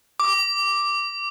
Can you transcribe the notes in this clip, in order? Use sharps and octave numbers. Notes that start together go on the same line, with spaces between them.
D6